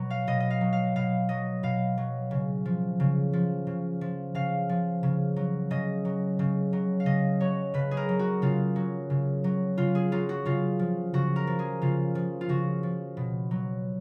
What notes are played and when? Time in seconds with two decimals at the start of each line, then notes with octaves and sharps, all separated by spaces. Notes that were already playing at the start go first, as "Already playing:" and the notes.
Already playing: B2 F#3
0.10 F5
0.27 B2 D#5
0.40 D#5
0.50 F5
0.61 F#3
0.73 F5
0.96 B2 F5
1.29 F#3 D#5
1.63 B2 F5
1.98 F#3
2.31 C#3
2.65 F3
3.00 C#3
3.33 F3
3.67 C#3
4.01 F3
4.35 C#3 F5
4.69 F3
5.03 C#3
5.36 F#3
5.71 C#3 D#5
6.05 F#3
6.39 C#3
6.73 F#3
7.00 F5
7.06 C#3 D#5
7.40 F#3 C#5
7.74 C#3 B4
7.91 G#4
7.97 A#4
8.09 F#3
8.19 F#4
8.42 C#3 F4
8.76 F#3
9.10 C#3
9.44 F#3
9.78 C#3 F4
9.95 G#4
10.12 F#3 F4
10.29 F#4
10.45 C#3 F4
10.79 F3
11.14 C#3 F#4
11.36 A#4
11.47 F3
11.59 G#4
11.82 C#3 F4
12.15 F3
12.41 F4
12.49 C#3 F#4
12.83 F3
13.17 B2
13.51 F#3